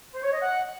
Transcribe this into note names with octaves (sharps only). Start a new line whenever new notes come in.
C5
C#5
D#5
F#5